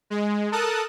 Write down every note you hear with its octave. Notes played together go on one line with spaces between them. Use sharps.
G#3
A4 A#4 A5 D#6 F#6